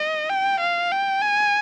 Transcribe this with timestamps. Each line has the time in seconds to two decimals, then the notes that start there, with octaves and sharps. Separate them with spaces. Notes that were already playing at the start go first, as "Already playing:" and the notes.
Already playing: D#5
0.30 G5
0.60 F5
0.92 G5
1.22 G#5